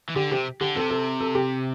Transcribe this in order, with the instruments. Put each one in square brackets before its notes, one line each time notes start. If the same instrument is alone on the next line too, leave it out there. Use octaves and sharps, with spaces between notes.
[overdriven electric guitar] E3
[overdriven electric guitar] D3 [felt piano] G4
[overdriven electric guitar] C3 [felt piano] G4
[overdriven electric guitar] D3 [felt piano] G4
[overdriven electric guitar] C3 [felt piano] A4
[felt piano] A4
A4
G4